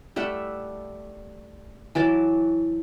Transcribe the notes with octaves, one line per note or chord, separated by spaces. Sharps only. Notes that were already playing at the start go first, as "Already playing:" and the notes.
G3 A3 E5 F#5
E3 F#3 A5 D6